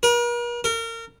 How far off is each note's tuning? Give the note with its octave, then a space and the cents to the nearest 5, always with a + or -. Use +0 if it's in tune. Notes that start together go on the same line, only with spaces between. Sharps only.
A#4 +45
A#4 -30